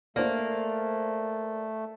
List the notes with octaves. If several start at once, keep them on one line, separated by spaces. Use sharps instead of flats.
A3 A#3 C5 D5